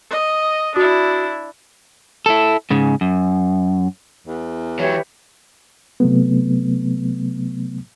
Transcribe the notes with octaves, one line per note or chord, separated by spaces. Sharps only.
D#5
D4 E4 F#4 D#6
E4 A4
G#2 C#3
F#2
E2
E3 F#3 G4 B4 C#5 E5
C3 F#3 A3 B3